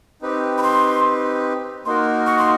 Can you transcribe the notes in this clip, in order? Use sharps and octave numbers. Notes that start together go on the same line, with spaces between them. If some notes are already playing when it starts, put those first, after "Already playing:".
C4 D#4 G4 B4
B5
C6
A#3 D#4 F#4 A#4 C6
C#6
C6